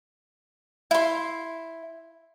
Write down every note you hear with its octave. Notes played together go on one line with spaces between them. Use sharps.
E4 C6